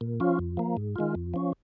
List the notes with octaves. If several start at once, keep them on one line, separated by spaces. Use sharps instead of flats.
A#2
F3 C#4 F4
F2
F3 A#3
G#2
D#3 G#3 F4
F2
F3 C#4